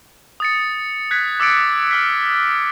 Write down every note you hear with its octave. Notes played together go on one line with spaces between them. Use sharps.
D#6 A6 C#7
F#6 G#6 B6
D6 E6 A6 C#7 D7
E6 F6 B6